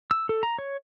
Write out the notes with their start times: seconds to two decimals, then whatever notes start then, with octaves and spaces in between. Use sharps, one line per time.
0.11 E6
0.29 A4
0.43 A#5
0.59 C#5